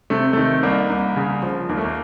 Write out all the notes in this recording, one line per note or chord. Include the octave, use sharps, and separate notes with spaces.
C3 A3
D#3 A3
C2 A#3
C2
C#3
F3
D#2 A#3
A3
A#3